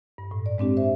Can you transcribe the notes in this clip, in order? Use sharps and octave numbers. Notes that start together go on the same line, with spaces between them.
G2
A2
D5
G#3 C4 D4 G4
C5 E5